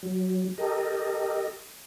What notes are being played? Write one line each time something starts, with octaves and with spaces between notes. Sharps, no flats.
F#3
G4 A4 A#4 D#5